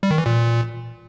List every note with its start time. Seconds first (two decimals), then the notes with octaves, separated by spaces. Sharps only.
0.03 G3
0.11 D#3
0.18 E3
0.26 A#2